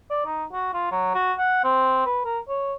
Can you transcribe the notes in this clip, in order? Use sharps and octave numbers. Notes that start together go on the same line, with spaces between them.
D5
D#4
F#4
F4
F#3
F#4
F#5
C4
B4
A#4
C#5